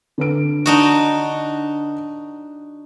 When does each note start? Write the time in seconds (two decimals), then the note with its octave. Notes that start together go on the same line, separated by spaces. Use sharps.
0.18 D3 B4 D7
0.66 D4 D#4 F#4